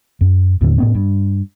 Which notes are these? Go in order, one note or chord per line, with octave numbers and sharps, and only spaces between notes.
F#2
D#2 A2 D3
A2 B3 C#4
G2